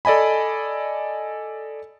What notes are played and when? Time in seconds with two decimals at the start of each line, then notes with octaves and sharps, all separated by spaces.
0.05 A4 D5 D#5 G#5 B5